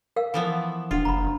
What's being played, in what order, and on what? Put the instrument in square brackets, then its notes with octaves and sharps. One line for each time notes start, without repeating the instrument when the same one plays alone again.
[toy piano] A#4 F5 E6
[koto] E3 F3 B3
[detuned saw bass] D#1 [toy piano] D4 F#5 [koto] F4
[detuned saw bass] F#1 [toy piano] A#5 B5